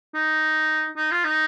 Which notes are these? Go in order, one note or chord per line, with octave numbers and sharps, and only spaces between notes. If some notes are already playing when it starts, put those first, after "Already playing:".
D#4
D#4
F4
D#4